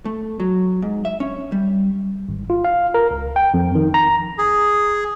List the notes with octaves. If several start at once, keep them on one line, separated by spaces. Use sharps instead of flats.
A3
F#3
G#2
E5
C#4
G3
G#1
F4
F5
A#4
C#2
G5
F2
D#3
A#5
G#4